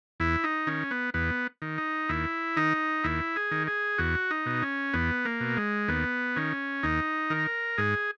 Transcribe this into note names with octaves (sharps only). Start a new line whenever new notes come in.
E2 E4
D#4
D#3 C#4
B3
E2 B3
D#3
D#4
D#2 E4
D#3 D#4
D#2 E4
G#4
D#3
G#4
E2 F#4
D#4
B2
C#4
E2 B3
A#3
B2
G#3
D#2 B3
D#3 C#4
D#2 D#4
D#3 A#4
G#2 G#4